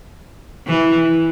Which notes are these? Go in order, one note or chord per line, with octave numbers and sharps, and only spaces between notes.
E3